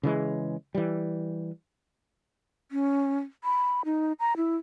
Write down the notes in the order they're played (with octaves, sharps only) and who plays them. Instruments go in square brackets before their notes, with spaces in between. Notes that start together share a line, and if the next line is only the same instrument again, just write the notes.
[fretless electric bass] C#3 E3 G#3
E3 G3
[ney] C#4
B5
D#4
A#5
E4